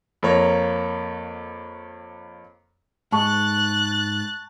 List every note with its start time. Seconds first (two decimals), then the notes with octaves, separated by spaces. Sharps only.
0.23 F2 A#3 C#5 A#5
3.12 G#2 A5 C#6 F#6 A6